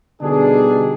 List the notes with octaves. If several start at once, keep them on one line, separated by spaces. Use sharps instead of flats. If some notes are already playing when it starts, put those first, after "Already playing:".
B2 D3 G3 D4 D#4 G#4